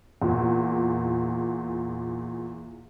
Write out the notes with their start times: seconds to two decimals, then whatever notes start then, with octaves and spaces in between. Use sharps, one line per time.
0.22 E2 A#2